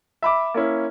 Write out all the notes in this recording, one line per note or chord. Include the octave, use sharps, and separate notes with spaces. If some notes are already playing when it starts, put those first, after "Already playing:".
E5 B5 D6
A#3 C#4 E4